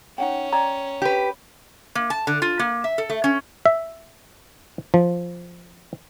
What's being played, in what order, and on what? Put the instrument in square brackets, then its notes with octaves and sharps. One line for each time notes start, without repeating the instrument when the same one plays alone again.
[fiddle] C#4 [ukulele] D#4 F#5 G5
[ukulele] C#5 D5 G5 [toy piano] A#5
[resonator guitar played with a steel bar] G4 B4
A#3
A5
D3
F4
A#3
E5
A4
A3
C#4
[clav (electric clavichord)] E5
F3